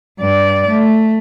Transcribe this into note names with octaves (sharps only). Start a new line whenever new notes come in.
G2 D5
A3